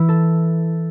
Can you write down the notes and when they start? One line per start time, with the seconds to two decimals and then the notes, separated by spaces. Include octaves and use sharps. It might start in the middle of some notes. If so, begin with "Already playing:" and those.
Already playing: E3 E4
0.09 A4